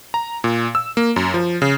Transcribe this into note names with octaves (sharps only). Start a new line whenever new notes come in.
A#5
A#2
E6
A#3
F#2
F3
C#3